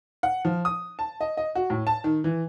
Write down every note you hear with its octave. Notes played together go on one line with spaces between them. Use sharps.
F#5
F3
D#6
A5
D#5
D#5
F#4
A2
A5
D#3
E3